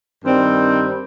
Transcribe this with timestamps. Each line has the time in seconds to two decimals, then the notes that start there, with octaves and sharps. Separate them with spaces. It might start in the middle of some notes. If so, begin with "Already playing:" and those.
0.25 G2 D#3 G3 C4